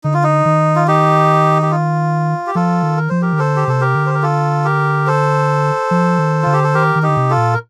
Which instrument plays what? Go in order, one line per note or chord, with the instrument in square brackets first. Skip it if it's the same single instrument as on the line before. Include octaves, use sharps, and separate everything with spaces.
[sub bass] D3 [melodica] D#4
[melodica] F4
D#4
[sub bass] D#3
[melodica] F4
D#4 G4
G4
F4
G4
[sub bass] F3 [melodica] F4 A4
[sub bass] D#3
[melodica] A#4
[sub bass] F3 [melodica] C5
[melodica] G4 A#4
[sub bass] D#3
[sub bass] D3 [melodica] A4 C5
[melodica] G4
[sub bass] C3 [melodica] A4
[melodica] G4 A#4
[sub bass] D3
[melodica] C5
A#4
F4 A4
G4 A#4
A4 C5
[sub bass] F3
D#3
[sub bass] D3 [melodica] F4
[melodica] G4
A4
[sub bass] D#3 [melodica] G4 A#4
[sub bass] D#3
[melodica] D#4 G4
[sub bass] D3
C3
[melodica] F4 A4
[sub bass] A#2
[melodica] A#4